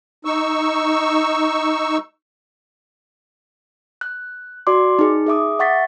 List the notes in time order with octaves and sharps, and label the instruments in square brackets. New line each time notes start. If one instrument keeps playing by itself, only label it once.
[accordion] D#4 C#6 E6
[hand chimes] F#6
F#4 D5 C6 D6
D#4 G#4
G#4 E5 D6 D#6
E5 F#5 C#6 A6 B6